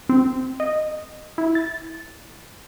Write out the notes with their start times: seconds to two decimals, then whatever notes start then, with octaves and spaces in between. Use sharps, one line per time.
0.09 C4
0.60 D#5
1.38 E4
1.55 A6